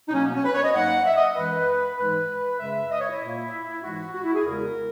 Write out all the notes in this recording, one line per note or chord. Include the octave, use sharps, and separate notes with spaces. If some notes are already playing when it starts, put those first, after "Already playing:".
D#4
B2 F#3 A#3 C#4
B3
C#4
B4
C#5
D#5
G#2 F#3 A#3 F#5
E5
D#5
F#2 E3 G#3 B4
G#2 E3 G#3 B4
F#2 C#3 G#3 E5
D#5
C#5
E4
A#2 A#3
G#2 E3 G#3 F#4
F#4
E4
G#4
E2 C#3 G#3 A#4